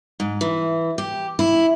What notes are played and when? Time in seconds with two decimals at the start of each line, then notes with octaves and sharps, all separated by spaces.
0.20 G#2
0.41 E3
0.98 G4
1.39 E4